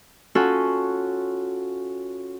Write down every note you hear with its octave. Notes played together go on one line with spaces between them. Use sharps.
C#4 F4 F#4 A4